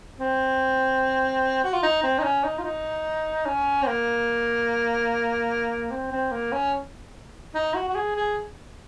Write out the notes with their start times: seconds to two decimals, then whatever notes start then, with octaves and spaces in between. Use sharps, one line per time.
0.20 C4
1.64 F#4
1.74 F4
1.83 D#4
2.03 C4
2.19 D#4
2.24 C#4
2.44 D#4
2.59 F4
2.65 D#4
3.46 C#4
3.82 C4
3.87 A#3
5.91 C4
6.12 C4
6.32 A#3
6.52 C#4
7.55 D#4
7.74 F#4
7.88 F#4
7.95 G#4
8.16 G#4